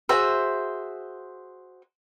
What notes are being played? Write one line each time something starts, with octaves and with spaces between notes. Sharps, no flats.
F#4 G#4 C5 E5